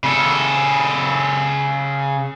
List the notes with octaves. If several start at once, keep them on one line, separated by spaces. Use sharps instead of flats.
C#3 A4